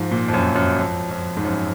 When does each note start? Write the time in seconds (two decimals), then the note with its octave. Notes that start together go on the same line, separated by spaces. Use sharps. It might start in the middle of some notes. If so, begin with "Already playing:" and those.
Already playing: G#2 F3
0.12 A#2
0.28 F2
0.34 F#2
0.56 F#2
0.78 F2
1.11 F2
1.37 G#2
1.45 F#2